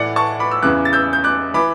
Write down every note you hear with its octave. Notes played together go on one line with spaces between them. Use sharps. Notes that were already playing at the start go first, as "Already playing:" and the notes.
Already playing: A2 E3 D5 F#5
A5 C#6
B5 D6
E6
E2 C#3 E3 D6 F#6
A6
E6 G6
G6
D6 F#6
E3 B5 D6